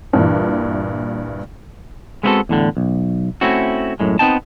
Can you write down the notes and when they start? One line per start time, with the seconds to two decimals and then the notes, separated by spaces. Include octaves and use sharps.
0.13 G2 A#2 E3
2.23 G#3 B3 C4 E4 F#4 A4
2.49 E2 A2 D3
2.77 B1
3.41 A3 C4 C#4 E4 F#4
4.00 F#2 A2 G#3
4.19 B3 C4 D#4 G5 A5